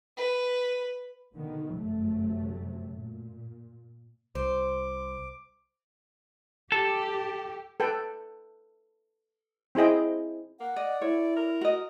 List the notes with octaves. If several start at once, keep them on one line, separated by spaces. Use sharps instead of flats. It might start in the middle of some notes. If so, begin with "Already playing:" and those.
B4
B2 D3 D#3 B3
G1 F#2 C3 F#3 A3
A#2
C2 C5 D6
G4 A4
A4 B4 G5
C4 E4 G#4 D#5 G5
A#3 F#5
D5 D#5
E4 A4 C#5
A#4
F#4 D#5